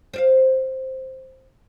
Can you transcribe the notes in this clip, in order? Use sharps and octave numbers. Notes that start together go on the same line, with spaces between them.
C5 D5 F5